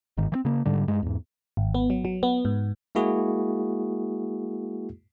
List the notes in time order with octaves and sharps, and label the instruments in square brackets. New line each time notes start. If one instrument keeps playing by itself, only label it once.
[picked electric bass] G1 G#2 D#3
E3 C4
C#3 A#3
G#2 D3 G3
G2 G#3
E2 G#2
[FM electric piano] G#1
B3
F#3
F#3
B3
G#2
[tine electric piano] G#3 A#3 E4 F#4 G#4